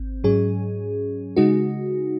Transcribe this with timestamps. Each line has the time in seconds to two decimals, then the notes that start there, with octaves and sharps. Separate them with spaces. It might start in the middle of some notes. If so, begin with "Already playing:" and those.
Already playing: G#1 C4
0.24 G#2 F#3 C#4 G#4
1.36 C#3 G#3 D#4 F#4